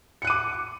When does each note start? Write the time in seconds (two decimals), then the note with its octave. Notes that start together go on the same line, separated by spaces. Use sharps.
0.22 C#7
0.25 F#6
0.27 D#7
0.30 D6